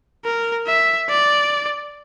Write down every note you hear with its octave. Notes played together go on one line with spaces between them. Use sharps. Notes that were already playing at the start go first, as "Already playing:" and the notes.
A#4
E5
D5